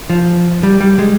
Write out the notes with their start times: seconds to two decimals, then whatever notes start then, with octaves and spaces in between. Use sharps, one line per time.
0.10 F3
0.63 G3
0.80 G3
0.99 G#3